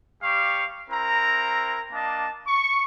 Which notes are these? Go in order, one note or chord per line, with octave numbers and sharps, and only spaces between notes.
G3 G4 F5 C#6
C4 E4 A#4 A#5
A#3 D4 D#5 A5
C#6